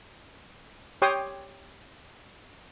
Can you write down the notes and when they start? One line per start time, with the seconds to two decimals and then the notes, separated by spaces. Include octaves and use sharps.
1.02 G4 C#5 G5 C6 D#6